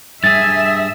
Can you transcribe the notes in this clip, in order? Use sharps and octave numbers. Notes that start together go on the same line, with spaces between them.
G2 G#4 E5 A6